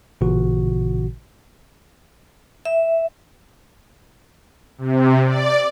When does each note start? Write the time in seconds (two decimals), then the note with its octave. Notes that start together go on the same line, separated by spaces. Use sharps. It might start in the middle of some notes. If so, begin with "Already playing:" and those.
0.21 A1 A#2 C#3 E3 F#4
2.65 E5
4.78 C3
5.26 D5